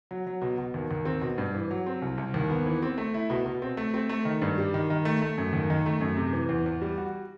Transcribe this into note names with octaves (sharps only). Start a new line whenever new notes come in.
F#3
F#3
B2
B2
D#2
D#2
C4
B2
G2
E3
F#3
C4
C2
C2
D#2
B3
E3
C4
A3
E4
B2
B2
C4
A3
C4
A3
D#3
G2
G3
D#3
D#3
A3
A3
F#2
D#2
D#3
A3
F#2
C3
E3
E2
E2
G3
F#4